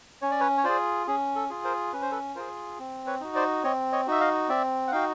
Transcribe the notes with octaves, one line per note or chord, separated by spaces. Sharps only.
C#4 C#5
D5
B4 C#5
C#5
F4 G#4 C5 D5
C#4 G#4
A4
F4 G#4
A#4 C5
C#4 B4
C5
A4 B4
F4 G#4 A#4 C5
C4
B4 C#5
D#4 F#4
C5 D5
C4 C#5 D#5
C#5 D#5
D#4 F#4 E5
D#5 F5
C4 D5 E5
F#5
D#4 F#4 F5 G5